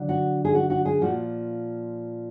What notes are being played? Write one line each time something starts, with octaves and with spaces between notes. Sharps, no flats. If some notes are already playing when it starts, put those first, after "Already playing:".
Already playing: D3 F#3
F#4
G#4
F#4
F#4
G#4
A#2 F3 F#4